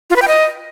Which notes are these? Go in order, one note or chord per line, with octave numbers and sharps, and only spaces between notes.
F4
B4
G5
D#5